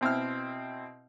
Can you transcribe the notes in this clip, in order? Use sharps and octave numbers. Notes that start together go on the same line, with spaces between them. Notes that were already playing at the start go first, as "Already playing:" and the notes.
B2 C4 E4 F6